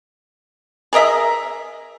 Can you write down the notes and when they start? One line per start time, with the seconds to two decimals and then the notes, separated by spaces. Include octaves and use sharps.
0.93 G#4 A#4 D#5 E5